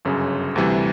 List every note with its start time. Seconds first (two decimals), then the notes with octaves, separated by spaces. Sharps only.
0.05 G1 F#2 C#3
0.56 D2 C3 E3 G3